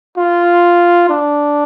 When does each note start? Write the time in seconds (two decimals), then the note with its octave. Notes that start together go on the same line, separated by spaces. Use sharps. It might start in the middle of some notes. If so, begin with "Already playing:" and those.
0.17 F4
1.09 D4